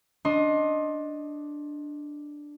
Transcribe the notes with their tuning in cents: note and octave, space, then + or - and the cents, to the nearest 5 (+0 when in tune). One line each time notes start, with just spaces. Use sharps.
D4 +0 D#5 +0 C6 +25